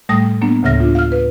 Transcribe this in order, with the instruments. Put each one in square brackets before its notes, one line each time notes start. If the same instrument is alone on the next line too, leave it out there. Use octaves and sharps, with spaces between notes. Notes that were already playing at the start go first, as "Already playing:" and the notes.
[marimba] A2 G3 A3 D#6 A#6
F#3 A#3 B3 D4
D2 A2 C#3 E5 F6 A#6
D4 F4
F5 F6
B4